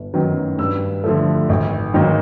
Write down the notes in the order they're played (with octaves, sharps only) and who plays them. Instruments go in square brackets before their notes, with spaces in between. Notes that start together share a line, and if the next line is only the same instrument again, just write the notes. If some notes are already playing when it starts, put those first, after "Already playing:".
Already playing: [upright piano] G1
F#2 D#3 F#3 B3
G2 E6
D3 F3 A3
G#1
G#2 D#3 F#3 A#3